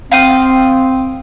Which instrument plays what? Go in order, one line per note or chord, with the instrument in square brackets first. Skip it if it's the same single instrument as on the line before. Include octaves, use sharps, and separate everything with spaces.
[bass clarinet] C4 [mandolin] F5 G5 D#6